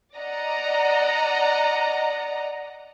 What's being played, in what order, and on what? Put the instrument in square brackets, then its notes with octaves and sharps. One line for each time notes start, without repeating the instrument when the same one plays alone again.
[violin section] D5 D#5 F#5 A#5